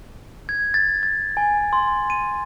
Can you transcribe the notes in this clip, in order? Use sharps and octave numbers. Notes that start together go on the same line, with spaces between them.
G#6
A6
A6
G#5
C6
D#7